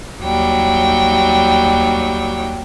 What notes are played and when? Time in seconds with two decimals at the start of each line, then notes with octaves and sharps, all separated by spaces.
0.20 D#2 F#3 G3 G5